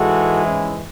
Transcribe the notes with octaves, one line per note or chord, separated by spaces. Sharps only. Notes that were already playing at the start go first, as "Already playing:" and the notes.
Already playing: G#2 E3 G#3 F#4 A4
C#4 E4